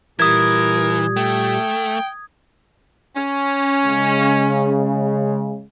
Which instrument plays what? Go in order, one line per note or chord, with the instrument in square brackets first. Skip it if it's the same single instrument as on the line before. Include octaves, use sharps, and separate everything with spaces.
[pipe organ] A#2 G3 G4 [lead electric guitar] E3 [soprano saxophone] A#4 [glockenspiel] D#6 G#6
[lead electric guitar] A3 [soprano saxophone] G5
[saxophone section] C#4
[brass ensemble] C#3 G#3